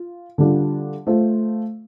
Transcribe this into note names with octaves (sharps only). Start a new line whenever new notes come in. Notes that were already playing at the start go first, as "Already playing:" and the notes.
Already playing: F4
D3 G3 D4 F4
A3 F4 C5